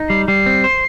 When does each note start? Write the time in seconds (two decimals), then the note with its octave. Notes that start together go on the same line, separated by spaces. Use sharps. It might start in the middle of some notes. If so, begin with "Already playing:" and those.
Already playing: D#4
0.09 G3 C7
0.28 G3 C7
0.46 C4
0.64 C5